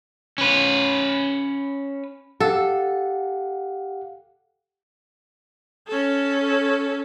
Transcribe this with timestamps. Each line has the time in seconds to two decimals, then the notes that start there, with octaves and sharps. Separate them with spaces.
0.38 C#4 B4
2.40 G4 A4 F5 F#5
5.88 C#4 A4